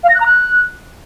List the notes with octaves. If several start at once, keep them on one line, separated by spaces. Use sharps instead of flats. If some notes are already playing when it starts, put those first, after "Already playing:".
F5
A#6
F#6
A#5
F#6